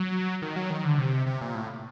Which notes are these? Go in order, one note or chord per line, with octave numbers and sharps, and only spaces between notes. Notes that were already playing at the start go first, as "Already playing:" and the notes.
Already playing: F#3
D#3
F#3
D#3
D3
C3
C3
A#2
A2